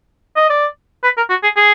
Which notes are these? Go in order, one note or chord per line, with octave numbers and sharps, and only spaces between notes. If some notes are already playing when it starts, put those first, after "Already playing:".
D#5
D5
B4
A#4
F#4
G#4
G#4